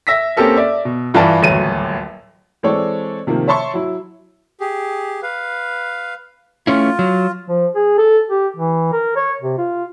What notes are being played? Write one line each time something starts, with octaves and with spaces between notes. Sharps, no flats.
E5 E6 A#6 B6
A#3 C4 C#4 G4 A4 A#4
D5 E5
B2
G2 E3 F4 D5 A5
D#1 A1 D2 F#3 D#7
E3 G#3 C4 A4 C#5 D5
C3 D#3 F3 A#3
C#5 E5 A5 C6 C#6
F#3 E4
G4 G#4
B4 F5
A3 C#4 E4 F4
F#3
F3
G#4
A4
G4
E3
A#4
C#5
C3
F4